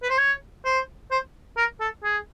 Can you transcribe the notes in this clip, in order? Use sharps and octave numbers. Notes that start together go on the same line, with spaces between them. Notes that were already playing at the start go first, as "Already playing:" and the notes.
B4
C5
C#5
C5
C5
A#4
A4
G#4